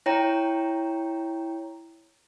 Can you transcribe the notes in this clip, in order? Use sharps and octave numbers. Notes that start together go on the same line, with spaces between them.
E4 C#5 G5 A#5